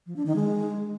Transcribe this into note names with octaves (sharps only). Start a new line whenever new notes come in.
F3
D4
D#3
G#3